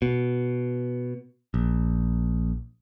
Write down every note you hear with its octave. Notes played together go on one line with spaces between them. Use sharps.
B2
A#1